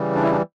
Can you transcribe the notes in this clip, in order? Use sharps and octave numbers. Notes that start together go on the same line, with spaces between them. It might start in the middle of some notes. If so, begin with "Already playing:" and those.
Already playing: C#3 E3 G3
D4
E4
D4